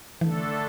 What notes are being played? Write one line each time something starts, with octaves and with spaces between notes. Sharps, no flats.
D3 E3 A3 D4 A4